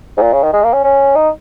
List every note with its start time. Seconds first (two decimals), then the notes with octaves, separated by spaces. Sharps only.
0.17 G#2
0.22 A#2
0.33 C#3
0.43 D#3
0.53 G#3
0.63 A#3
0.73 C#4
0.84 C#4
1.15 D#4